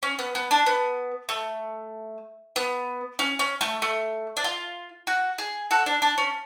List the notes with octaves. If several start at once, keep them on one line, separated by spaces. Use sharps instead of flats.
C#4
B3
B3
D4
B3
A3
B3
C#4
C#4
A3
A3
D4
F4
F#4
G#4
F#4 A4
D4
D4
C#4